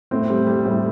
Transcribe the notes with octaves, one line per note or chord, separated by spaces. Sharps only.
A2 C4
G3
G3
A2